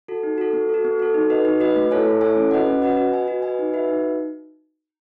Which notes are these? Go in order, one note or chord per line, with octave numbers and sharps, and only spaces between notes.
F#4 A4
D#4
F#4 A4
B3
A4
F#4
B3
F#4 A4
D#4
F#4 B4 D#5
D#4
F#4 B4 D#5
A3
E4 A4 C#5 G#5
A3
E4 A4 C#5 G#5
C#4
F#4 B4 D#5 F#5
C#4
F#4 B4 D#5 F#5
F#4
B4 D#5 G#5
F#4
B4 D#5 G#5
D#4
F#4 B4 E5
D#4